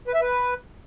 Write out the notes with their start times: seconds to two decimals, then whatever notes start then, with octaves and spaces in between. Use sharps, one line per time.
0.07 B4
0.14 E5
0.21 B4